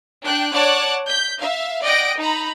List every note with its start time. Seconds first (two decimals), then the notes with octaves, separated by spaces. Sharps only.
0.24 D4 G5 F#6
0.54 C#5 D5 F#5 A5 D6 F#6
1.08 G6 B6
1.38 E5 F5
1.83 D5 D#5 F#5 G5 A#6 D7
2.19 D#4 A#5 B5